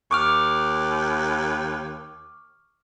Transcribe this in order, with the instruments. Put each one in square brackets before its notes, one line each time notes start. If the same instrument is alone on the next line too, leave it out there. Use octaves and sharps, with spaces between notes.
[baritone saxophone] D#2 [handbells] C#6 D6 F6